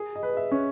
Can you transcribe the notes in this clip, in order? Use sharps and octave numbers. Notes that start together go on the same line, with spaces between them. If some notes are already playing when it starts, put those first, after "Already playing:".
Already playing: G#4
D#5
B4
D#5
E5
C#4